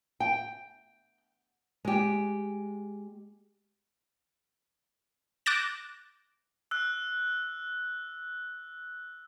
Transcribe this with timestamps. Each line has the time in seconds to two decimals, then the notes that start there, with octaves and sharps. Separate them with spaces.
0.20 G5
1.85 G#3 G4
5.46 D6 F#6 G6 A6 A#6 E7
6.71 E6 F#6